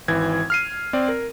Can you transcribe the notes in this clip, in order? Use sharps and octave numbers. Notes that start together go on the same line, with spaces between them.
G#1 E3 G#6
F6 C7 D#7
C4 D5
A#4